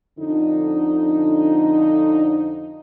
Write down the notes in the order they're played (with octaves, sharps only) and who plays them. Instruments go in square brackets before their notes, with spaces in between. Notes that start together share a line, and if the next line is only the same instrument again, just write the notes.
[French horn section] F2 D3 D#4